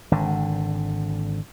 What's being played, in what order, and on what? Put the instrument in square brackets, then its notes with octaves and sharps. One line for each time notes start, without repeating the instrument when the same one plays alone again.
[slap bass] G#1 D3